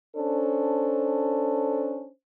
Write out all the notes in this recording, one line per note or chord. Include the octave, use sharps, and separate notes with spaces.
C#4 D4 A4 C5